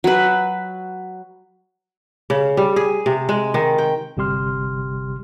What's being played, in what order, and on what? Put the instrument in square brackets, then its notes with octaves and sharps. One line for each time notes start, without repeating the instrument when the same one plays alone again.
[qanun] F#3 B4
[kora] C#3
G3
G#4
C3
G#3
D#3
G5
[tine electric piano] G1 C3 G3 G4 C6 F6